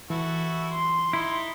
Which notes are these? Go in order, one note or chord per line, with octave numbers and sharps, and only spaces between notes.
E3 E4 F#4 A4
C6
D#4 E4